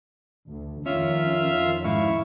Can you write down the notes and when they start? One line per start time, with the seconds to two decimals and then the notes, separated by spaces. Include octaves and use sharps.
0.49 D2
0.86 F2 D#3 C#4 F4 E5 F6
1.84 G#2 E4 F5 C#6